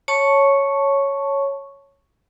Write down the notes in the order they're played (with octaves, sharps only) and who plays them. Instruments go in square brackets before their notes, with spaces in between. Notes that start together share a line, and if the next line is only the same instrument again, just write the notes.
[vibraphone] C#5 A5 C#6